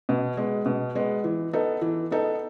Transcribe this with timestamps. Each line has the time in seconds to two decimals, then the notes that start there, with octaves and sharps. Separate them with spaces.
0.09 B2
0.37 G#3 B3
0.66 B2
0.95 G#3 B3
1.24 E3
1.53 B3 D#4 A4
1.81 E3
2.11 B3 D#4 A4